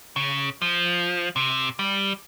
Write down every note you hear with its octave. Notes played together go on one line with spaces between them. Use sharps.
C#3
F3
C3
G3